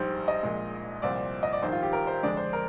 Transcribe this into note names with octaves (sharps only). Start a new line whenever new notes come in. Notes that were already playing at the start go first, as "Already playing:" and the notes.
Already playing: A#1 G#2 G3 C5
D#5
A#1 A#2 G#3
C2 A#2 F3 C4 D5
D#5
D5
A#1 G#2 D#3 G3 C5
F4
G4
A#4
C5
F2 D3 G#3 D4 D5
C5
A#4